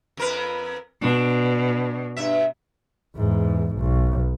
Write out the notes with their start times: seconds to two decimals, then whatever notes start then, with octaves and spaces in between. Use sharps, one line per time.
0.17 F2 A#4 B4
1.02 B2 D4
2.16 G2 E5
3.16 E2 G#2
3.77 B1